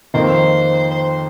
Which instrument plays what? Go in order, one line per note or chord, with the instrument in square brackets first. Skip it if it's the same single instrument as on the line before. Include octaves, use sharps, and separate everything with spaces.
[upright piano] F2 D#3 A#3 [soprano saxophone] C5
[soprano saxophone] C5